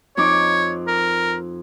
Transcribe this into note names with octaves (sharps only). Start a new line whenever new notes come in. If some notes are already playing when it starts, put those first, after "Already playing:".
F2 D#4 C#5 D6
A#4